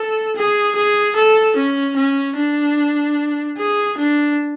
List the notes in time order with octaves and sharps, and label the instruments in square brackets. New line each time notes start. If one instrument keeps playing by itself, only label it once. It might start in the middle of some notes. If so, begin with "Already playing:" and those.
Already playing: [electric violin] A4
G#4
G#4
A4
C#4
C#4
D4
G#4
D4